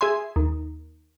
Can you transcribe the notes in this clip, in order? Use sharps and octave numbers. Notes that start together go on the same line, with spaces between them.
G#4 E5 G#5 C6
D#2